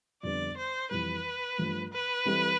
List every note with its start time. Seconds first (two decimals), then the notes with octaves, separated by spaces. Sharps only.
0.23 F2 D3 G3 B3 D5
0.57 C5
0.91 F2 E3 G3 B4
1.58 G2 F3 A3
1.92 B4
2.25 E3 G3 C4 E4 A4